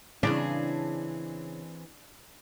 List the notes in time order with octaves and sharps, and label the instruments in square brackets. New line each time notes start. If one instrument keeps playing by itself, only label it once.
[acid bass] C#3 [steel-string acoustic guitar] E3 C4 G#4 [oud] D4